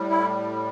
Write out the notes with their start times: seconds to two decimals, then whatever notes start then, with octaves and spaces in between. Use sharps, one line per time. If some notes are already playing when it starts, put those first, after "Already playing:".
Already playing: A2 G3
0.10 E4